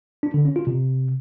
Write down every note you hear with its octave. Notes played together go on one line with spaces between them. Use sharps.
D4
D3
C#4
F4
C3